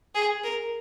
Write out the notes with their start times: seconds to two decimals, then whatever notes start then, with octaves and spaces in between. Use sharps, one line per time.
0.15 G#4
0.44 A#4